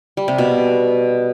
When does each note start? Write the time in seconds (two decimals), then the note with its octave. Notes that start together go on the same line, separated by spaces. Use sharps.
0.17 G3
0.28 C3
0.38 B2